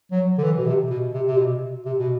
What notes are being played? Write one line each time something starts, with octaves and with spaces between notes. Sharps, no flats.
F#3
D3
E3
B2
C3
B2
C3
C3
B2
C3
B2